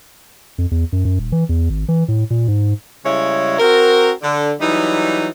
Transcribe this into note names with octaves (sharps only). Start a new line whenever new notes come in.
F2
E2
F#2
F#2
D#1
E3
E2
G#1
E3
A2
A#2
G#2
C#3 G3 G#3 E4 C#5
C4 F#4 A#4
D3
E3 F#3 G3 D#4